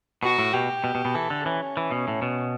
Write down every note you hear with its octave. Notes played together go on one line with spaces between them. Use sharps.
B2 F#4
A2
B2 G4
B2
B2
B2
E3 A4
D3
E3 C#4
E3
B2
A2
B2